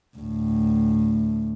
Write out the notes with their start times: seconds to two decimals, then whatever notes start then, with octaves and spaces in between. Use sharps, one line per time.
0.17 D2 A2